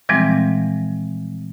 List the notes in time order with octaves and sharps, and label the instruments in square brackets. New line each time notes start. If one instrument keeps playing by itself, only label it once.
[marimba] A#2 E3 F3 G3 G#3 C4